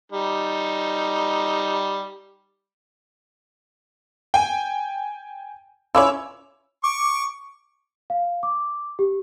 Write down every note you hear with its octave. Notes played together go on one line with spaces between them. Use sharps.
G3 D#4
G5 G#5
C#4 E4 F4 C#5 D6 E6
C#6 D6
F5
D6
G4